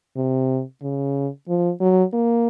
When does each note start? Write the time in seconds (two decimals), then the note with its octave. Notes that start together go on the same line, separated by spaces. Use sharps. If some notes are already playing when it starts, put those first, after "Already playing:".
0.16 C3
0.82 C#3
1.48 F3
1.81 F#3
2.13 A#3